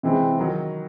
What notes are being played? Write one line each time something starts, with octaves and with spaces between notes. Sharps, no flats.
C3 E3 G#3 C4
D#3 F#3